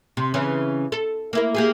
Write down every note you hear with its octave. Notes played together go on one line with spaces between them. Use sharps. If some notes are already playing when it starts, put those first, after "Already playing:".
C3
C#3 E3 C#4
A4
A#3 E4 A#4
A#3 G4 G#4